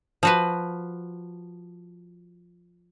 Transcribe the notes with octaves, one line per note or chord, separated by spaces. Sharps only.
F3 F#4 B4